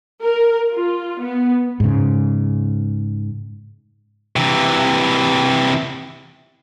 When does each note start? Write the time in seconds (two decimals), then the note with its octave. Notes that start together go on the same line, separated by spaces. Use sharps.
0.22 A#4
0.73 F4
1.20 B3
1.80 G#2 C#3
4.36 C3 E3